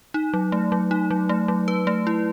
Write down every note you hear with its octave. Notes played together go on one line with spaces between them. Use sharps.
D#4
F#3
A3
F#3
D#4
F#3
A3
F#3
B4
A3
E4